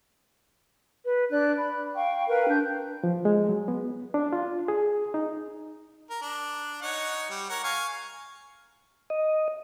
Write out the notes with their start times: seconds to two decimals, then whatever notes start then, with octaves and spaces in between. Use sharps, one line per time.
1.04 B4
1.30 D4 D5 F#6
1.57 B5
1.95 F5 G5 C#6
2.28 A#4 B4 F5 G5
2.48 D4 G6
3.04 F3
3.25 G#3
3.49 F#3
3.68 B3
4.14 D4
4.33 F4
4.68 G#4
5.14 D#4
6.10 A#4
6.22 D4
6.82 D#4 C#5 F#5
7.30 G3
7.50 A#4 C#5 F#5
7.64 F5 G#5 C#6
9.10 D#5